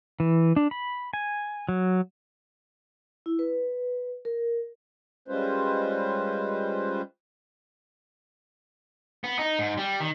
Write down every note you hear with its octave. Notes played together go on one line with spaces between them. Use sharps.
E3
D4
B5
G#5
F#3
E4
B4
A#4
G3 G#3 C#4 F4 B4 C5
B3
D#4
G#2
G3
D#3